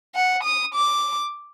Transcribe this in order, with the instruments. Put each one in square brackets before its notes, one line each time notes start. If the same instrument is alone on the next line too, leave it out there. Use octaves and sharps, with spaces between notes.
[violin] F#5
D#6
D6